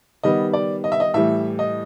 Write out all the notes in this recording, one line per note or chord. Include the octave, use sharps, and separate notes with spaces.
D#3 G3 B3 D#5
D5
D#5
E5
D#5
A2 E3 G3 E5
D#5